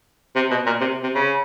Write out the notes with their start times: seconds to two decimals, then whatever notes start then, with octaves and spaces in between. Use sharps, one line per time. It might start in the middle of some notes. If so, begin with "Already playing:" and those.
0.36 C3
0.51 B2
0.66 A#2
0.81 C3
1.03 C3
1.15 C#3